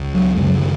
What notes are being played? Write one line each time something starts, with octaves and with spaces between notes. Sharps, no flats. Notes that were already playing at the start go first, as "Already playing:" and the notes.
Already playing: C#2 C#3
F#3
F#2 C#3 G#3
F#3
D#3